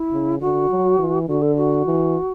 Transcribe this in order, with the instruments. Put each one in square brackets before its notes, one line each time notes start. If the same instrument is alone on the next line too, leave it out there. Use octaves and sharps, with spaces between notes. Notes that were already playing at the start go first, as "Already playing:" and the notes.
Already playing: [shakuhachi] E4
[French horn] C#3
[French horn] D3 [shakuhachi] F#4
[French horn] F#3
E3
[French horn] D3 [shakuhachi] F#4
[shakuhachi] A4
F#4
[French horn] E3